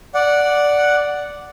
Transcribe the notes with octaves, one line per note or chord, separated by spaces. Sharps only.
D5 F#5